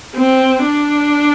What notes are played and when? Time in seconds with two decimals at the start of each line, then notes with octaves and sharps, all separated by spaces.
0.16 C4
0.63 D4